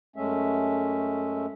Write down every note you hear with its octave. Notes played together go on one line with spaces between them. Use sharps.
F#2 G#3 A3 C#4 E5